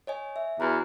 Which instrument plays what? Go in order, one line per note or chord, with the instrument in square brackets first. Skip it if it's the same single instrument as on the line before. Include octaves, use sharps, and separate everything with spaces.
[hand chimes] C#5 D#5 G#5
E5
[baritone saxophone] E2 [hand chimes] F#4 F#5 A#5